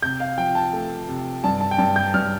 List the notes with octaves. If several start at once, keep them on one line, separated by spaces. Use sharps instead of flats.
C3 G6
F5
F3 G5
A5
A3
C3
G2 A5
A5
G5
G2 A5
G6
G2 F6